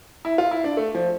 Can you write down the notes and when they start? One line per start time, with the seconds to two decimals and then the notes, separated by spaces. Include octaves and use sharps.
0.25 E4
0.38 F4
0.51 E4
0.64 D4
0.77 A3
0.95 F3